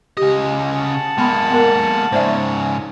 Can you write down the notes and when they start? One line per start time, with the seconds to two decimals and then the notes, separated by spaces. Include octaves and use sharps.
0.17 C#3 G4 D#5
0.79 F#5 A5
1.18 G#3 A#3 B3 B5
1.50 B3 A#4
2.12 G#2 C#3 C5 D5 E5